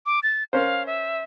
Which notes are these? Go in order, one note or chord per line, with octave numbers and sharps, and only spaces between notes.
D6
A6
C#4 A#4 C5 F5
E5